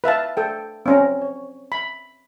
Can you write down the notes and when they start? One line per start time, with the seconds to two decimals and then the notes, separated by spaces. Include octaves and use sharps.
0.04 B4 E5 F5 A5
0.37 A4 G5
0.86 C4 C#4 A#5
1.22 C#5
1.72 B5